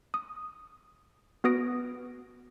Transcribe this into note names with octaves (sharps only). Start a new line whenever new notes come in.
D#6
B3 F#4 B4 D#6 A#6 D7